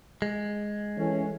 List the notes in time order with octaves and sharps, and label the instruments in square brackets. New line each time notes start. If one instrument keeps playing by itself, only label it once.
[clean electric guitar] G#3
[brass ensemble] E3 A3 C#4